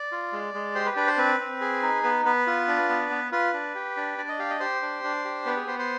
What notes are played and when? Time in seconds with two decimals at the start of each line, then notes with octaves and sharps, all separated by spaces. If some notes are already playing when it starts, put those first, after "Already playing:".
Already playing: D5
0.12 F4
0.33 G#3
0.54 G#3
0.75 G4 C5
0.86 B4
0.96 D4 B4
1.07 C5
1.18 C4 B4
1.40 C4
1.61 G#4
1.82 D#4
2.03 B3 B4
2.25 B3 B4
2.47 F4
2.68 D4
2.89 B3
3.10 B3
3.32 F4 B4
3.53 D4
3.75 G4
3.97 D4
4.18 D4 D5
4.29 D#5
4.39 G4 F5
4.50 D#5
4.60 G4 C5
4.82 D4
5.04 D4
5.25 G4
5.46 B3 B4
5.57 G#4
5.67 B3 C5
5.79 C5